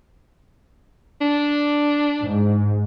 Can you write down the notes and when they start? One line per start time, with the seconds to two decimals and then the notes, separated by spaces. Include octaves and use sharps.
1.21 D4
2.21 G#2